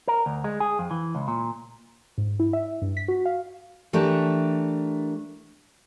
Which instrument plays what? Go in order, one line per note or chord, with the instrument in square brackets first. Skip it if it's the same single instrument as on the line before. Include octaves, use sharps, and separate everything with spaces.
[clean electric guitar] A#4
D2
G#3
G#4
F2
E3
C#2
A#2
[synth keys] G#2
E4
E5
G2
B6
F#4
F5
[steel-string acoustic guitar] E3 A3 D4 G4 A#4